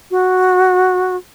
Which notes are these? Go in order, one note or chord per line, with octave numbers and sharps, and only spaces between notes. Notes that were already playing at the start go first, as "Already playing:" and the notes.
F#4